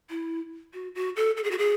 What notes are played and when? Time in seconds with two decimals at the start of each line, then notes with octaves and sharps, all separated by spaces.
0.10 E4
0.74 F#4
0.95 F#4
1.16 A4
1.37 A4
1.44 G#4
1.51 F#4
1.58 G#4